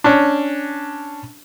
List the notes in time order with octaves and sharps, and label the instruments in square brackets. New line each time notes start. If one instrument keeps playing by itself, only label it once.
[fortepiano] C#4 D4